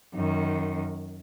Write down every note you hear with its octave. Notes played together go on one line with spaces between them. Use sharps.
F#2 D#3